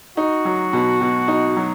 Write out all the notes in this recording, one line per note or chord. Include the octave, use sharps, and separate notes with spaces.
D#4 F#4
F#3
B2
B2
D#4
F#3